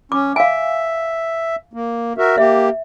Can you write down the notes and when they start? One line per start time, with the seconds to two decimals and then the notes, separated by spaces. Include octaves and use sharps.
0.12 C#4 D6
0.36 E5 F5 G#5
1.73 A#3
2.18 F#4 A#4 E5
2.38 A#3 G4 E5